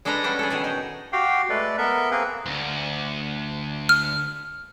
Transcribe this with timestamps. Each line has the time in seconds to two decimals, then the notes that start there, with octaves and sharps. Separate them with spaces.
0.05 G#3 D4 A4 B4 A#5
0.24 G3 B3 C#4 D4
0.39 G#4 A4
0.50 B2 D#3 G#4
0.64 D#4
1.13 F#4 G4 F5 G5
1.49 G#3 A3 A4 B4 D5
1.78 B3 A4 A#4 E5
2.11 A#3 C4 G#4 A#4 B4
2.46 D2
3.89 F6